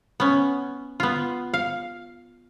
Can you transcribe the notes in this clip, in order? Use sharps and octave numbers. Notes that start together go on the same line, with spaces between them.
B3 C#4
B3 F4
F5